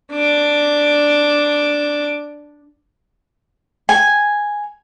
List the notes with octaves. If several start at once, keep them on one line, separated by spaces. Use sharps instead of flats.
D4 D6
G#5